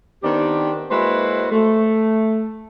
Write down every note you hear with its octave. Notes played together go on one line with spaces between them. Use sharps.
D#3 B3 C4 D4 G4
G#3 A#3 E4 F#4 B4 C5
A3